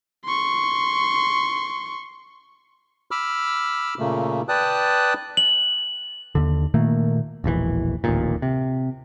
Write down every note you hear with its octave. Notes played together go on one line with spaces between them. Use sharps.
C6 C#6
B5 D6 E6 F6
A#2 C#3 A3 A#3
B4 D5 G5 A5 D#6 F#6
F#7
D#2 D3
A#2 D#3 A3 A#3
E1 A#1 A#2 E3
D1 A1 D#2 A#2
C3